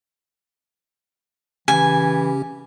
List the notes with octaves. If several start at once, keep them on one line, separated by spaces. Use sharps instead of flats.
C#3 E3 C#4 G4 G#5